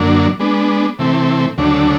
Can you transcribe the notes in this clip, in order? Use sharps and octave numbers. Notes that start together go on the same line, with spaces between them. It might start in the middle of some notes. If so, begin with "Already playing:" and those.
Already playing: F#2 D3 F#3 A#3 D4
G#3 B3 D4
C3 E3 A3 C4
D2 C#3 F#3 A3 D4